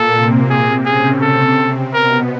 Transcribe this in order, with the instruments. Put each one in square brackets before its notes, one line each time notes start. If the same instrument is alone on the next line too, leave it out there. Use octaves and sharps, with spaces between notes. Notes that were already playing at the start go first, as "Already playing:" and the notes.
Already playing: [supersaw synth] A#2 A#3 [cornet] A4
[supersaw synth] C3 C4
[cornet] G#4
[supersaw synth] C#3 C#4 [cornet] G#4
[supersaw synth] C3 C4 [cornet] A4
[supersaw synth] B2 B3 [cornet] A#4